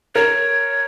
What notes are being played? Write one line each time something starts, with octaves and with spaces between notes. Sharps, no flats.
A#4 C#5